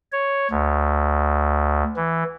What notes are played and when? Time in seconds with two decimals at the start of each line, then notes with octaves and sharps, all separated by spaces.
0.12 C#5
0.51 D2
1.96 E3